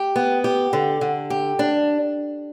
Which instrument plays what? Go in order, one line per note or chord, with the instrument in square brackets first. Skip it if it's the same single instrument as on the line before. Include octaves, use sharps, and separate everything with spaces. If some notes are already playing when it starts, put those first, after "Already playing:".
Already playing: [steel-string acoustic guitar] G4
B3
G4
D3
D3
G4
D4